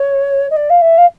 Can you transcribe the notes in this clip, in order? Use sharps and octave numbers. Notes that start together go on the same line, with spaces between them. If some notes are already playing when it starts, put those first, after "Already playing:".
Already playing: C#5
D#5
D5
F5
E5
F5